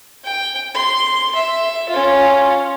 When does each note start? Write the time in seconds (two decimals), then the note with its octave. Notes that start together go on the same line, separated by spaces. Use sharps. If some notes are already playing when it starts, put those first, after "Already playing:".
0.24 G5
0.75 C6
1.35 E5
1.89 C#4 F4